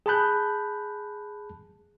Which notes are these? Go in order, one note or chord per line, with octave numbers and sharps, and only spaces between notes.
G#4 G#5 A5 B5 F#6 G6